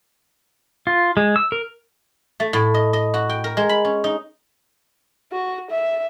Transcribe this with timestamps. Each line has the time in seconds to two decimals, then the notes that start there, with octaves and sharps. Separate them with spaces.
0.87 F4
1.17 G#3
1.36 E6
1.52 A#4
2.40 A3
2.53 A2
2.74 D#5
2.93 D#5
3.14 F#4
3.29 G5
3.44 A#4
3.57 G#3
3.69 B5
3.85 C#4
4.04 D#4
5.32 F#4
5.70 E5